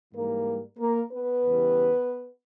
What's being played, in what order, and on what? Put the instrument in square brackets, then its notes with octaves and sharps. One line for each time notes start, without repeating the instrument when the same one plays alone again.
[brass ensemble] G#2 E3 G3 A#3 A#4
A#3 A#4
B3 B4
E2 C#3 E3 G3